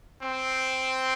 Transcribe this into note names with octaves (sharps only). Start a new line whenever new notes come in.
C4